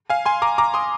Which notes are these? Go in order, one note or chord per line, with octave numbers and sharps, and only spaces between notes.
F5 G#5
G#5 C6
A#5 D6
A#5 D6
C6 D#6